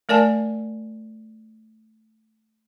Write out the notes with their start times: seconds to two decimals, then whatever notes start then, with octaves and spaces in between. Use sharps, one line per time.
0.09 A3 A#4 D5 G#5 A5